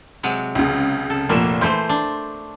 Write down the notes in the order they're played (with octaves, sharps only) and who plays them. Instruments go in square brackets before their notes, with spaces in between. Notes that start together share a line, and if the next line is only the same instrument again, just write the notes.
[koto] C3 F#3 G#3
[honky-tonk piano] C#2 C#3
[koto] A4
[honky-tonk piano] F1 A#2 E7 [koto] A#3
[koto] E3 A3 C5 [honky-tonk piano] C6 G6
[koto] D4